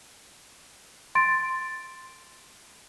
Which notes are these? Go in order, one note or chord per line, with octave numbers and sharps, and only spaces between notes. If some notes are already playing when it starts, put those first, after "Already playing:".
C6 A6 D7